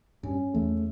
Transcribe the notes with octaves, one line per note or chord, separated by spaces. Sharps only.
G2 C#4
E2 A3